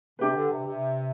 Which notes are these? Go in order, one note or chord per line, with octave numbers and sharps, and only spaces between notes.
C3 D4 G4 B4
D3
C3
C3